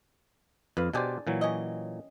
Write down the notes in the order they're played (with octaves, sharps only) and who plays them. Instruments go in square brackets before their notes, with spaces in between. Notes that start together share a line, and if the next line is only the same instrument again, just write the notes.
[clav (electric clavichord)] F2 F5 [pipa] B4
[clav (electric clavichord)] B2 G4 C5 [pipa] D4 G#4 D5
[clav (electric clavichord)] A#2 E3 F#3
[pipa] C#4 G4 D#5